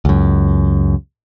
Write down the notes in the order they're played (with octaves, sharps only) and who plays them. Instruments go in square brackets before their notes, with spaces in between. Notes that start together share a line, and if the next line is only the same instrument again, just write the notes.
[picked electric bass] C#2 F#2